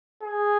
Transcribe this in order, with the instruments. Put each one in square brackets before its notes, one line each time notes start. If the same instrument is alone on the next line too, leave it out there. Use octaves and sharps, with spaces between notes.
[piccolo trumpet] G#4